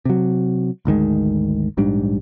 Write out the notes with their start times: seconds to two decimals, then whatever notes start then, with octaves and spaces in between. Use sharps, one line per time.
0.05 C3 F#3
0.85 G#1 D2 D#3 G#3
1.77 A#1 G#2 G3 D4